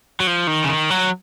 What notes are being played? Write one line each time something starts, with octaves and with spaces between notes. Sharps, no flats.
F#3
F3
D#3
C#3
D#3
F#3